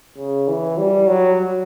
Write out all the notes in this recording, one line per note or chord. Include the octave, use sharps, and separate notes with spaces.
C#3
E3
G3
F#3